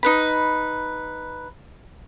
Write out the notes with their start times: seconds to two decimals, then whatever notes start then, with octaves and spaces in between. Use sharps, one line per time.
0.03 D#4 B4 B5